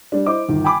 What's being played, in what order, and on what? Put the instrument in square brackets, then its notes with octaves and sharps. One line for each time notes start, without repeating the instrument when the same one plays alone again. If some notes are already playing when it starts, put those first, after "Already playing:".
[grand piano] G3 D4
E4 C5 D#5 D6
G1 D#3
G5 G#5 B5 D6